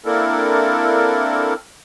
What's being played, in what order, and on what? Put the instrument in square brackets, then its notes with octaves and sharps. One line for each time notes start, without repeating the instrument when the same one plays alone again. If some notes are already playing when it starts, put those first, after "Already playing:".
[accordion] A#3 C4 D4 E4 A4 A#4